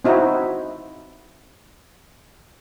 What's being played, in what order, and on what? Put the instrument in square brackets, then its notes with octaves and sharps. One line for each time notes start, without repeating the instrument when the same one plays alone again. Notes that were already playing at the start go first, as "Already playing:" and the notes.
[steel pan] C4 D#4 E4 F#4